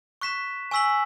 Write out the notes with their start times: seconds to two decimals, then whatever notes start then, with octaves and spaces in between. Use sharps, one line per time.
0.21 C#6 F#6 B6 E7
0.71 G#5 C#6 E6 B6 F#7